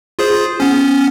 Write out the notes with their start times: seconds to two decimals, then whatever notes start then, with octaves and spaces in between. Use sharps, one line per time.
0.19 F4 G#4 C5
0.60 B3 C#4